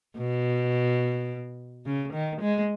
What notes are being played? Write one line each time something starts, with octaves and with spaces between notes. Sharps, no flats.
B2
C#3
D#3
G#3